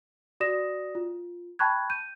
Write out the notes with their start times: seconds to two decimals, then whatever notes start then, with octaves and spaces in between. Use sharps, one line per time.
0.40 F#4 D5 D#6 A#6 E7
0.95 F4
1.59 G5 A5 B5 C#6 F#6 G#6
1.90 G6 D#7